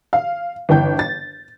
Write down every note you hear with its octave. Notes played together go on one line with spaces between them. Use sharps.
F5
G1 E3 G5 G6
A6